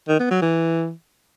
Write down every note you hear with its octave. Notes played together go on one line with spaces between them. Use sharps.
D#3
B3
F#3
E3